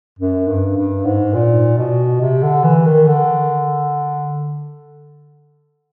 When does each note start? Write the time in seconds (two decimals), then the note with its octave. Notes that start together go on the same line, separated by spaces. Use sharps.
0.19 F#2
0.47 G2
0.77 G2
1.05 G#2
1.34 A#2
1.78 B2
2.21 C3
2.42 D3
2.64 E3
2.86 D#3
3.08 D3